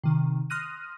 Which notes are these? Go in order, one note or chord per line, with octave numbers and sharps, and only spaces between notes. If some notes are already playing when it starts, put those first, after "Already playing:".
C3 D#3
C6 D#6 F6 F#6 A#6 D#7